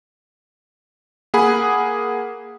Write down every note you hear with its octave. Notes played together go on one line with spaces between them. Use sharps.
A#3 G#4 F#5 B5